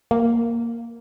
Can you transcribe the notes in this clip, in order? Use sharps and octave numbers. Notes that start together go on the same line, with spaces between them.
A#3